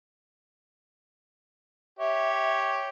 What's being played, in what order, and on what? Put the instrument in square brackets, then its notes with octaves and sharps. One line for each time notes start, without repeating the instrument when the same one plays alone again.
[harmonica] G4 C#5 [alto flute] E5